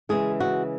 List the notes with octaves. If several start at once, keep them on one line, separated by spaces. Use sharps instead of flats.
C#3 E3 G#3 G#4
F#4